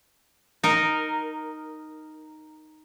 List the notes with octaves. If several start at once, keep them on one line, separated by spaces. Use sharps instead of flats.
D#4 A#4